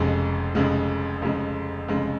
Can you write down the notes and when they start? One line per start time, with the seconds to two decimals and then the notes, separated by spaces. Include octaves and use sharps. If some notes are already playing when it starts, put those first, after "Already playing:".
Already playing: F1 F2 C#3 G#3
0.55 F1 F2 C#3 G#3
1.21 F1 F2 C#3 G#3
1.88 F1 F2 C#3 G#3